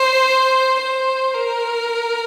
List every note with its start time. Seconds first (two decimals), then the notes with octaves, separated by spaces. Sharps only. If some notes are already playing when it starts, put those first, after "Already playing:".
Already playing: C5
0.79 C5
1.34 A#4